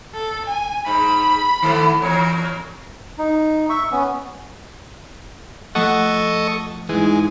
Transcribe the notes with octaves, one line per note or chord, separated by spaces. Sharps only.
A4
G#5
G#2 G#3 B5
D#3 A3 B3
E2 A#4 C#5
D#4
E5 C#6
B3 C#4
F3 A3 A4 D#5 F#5 C#6
G#2 E3 G#3